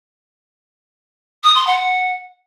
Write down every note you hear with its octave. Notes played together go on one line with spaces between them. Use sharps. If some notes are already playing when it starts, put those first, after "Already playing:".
D#6
C6
F#5